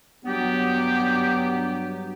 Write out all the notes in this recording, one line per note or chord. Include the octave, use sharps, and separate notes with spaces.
G2 F#3 B3 G4